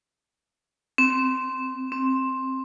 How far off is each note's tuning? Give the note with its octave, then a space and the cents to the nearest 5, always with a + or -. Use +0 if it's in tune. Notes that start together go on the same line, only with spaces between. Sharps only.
C4 -5
C4 +10